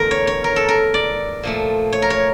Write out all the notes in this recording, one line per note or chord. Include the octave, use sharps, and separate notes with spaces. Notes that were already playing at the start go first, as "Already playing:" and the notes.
Already playing: E2 D3 A3 A#4
C#5
C#5
A#4
A4
A#4
D5
A#2 F3 A3
C#5
A#4
C#5